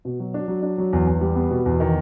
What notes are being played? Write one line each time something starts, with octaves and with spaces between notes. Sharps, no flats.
B2
F#3
D4
F#3
D4
F#3
E2
E2
G3
B3
B2
E2
D#3